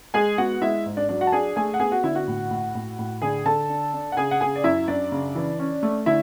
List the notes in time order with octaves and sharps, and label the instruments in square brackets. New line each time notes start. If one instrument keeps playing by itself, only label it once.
[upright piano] G#3 G#4 G#5
B3 F#4 F#5
G#3 E4 E5
G#2
D4 D5
F#3 D4 D5
F#4 F#5
A5
D4 G#4 G#5
A3 G#4 G#5
F#5
B3 G#4 G#5
F#4 F#5
D3 E4 E5
F#4 F#5
A2
A2
A2
A2
D3 G#4 G#5
D3 A4 A5
D4
D4
F#5
C#3 G#4 G#5
F#5
C#3 G#4 G#5
D5
F#2 E4 E5
F#2 D4 D5
C#3
E3
C#4
A3
D3 E4 E5